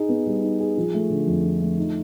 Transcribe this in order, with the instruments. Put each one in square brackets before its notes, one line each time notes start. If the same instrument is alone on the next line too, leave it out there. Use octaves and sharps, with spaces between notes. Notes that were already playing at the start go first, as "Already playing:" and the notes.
Already playing: [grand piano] D#4 G#4
B3
G3
D#4
G#4
F3
A3
D3
F2
F3
A3
D#4